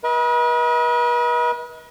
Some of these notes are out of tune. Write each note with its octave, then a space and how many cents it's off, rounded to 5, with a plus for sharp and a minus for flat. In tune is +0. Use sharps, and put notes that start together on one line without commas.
B4 -40 D#5 +35